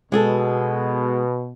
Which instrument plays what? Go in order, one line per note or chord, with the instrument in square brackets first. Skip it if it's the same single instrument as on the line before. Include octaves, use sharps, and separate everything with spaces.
[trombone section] B2 [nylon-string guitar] G#3 G#4 A4